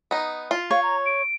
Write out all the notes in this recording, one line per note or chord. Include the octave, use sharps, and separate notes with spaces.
B3 D#4
F4
C#5 F5
A#5
D7